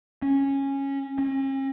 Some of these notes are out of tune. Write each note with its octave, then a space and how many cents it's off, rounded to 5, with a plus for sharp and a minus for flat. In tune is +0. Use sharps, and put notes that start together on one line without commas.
C#4 -10
C#4 -45